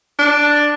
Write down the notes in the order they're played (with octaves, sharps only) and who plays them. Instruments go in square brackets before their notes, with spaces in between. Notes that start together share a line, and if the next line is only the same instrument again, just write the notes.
[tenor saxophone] D4